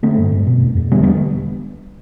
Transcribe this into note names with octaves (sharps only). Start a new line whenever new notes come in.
D3 A3 C4
G2
G2
B2
E2
E2
D3 G3 B3
G3 B3